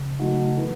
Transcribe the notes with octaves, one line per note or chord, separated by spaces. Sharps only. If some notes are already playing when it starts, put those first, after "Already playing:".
Already playing: C#3
F#3 A3 D#4 F#4
E3 B3